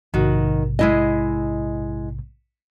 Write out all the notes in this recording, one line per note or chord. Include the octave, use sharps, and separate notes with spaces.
A#1 G#2 C3 D#3 F#4
G#3 E4 D#5